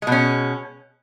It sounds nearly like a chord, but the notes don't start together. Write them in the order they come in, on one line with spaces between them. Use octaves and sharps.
G#3 B2 C#4